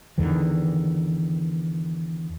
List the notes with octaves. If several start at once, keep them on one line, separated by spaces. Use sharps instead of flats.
E2 D3 D#3